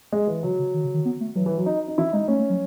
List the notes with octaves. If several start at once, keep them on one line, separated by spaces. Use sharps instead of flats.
G#3
E3
C#3 F#3
C#3
D#3
C#3
D#3
B3
A3
E3 F#3
E3
F#3
D#4
D#4
E3 E4
G#3 D#4
A3 C#4
A3
F#3